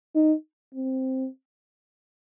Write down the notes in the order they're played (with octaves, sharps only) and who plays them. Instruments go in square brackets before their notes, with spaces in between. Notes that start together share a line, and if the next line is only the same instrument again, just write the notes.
[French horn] D#4
C4